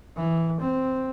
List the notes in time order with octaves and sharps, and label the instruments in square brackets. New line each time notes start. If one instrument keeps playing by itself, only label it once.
[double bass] E3
C4